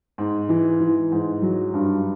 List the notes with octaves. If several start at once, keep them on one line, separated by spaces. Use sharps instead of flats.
G#2
E3
E3
G#2
F#3
G2